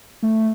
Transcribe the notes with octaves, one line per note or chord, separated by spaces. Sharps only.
A3